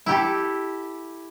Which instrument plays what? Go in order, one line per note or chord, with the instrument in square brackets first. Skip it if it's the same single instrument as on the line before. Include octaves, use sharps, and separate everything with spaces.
[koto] E4 G4 A4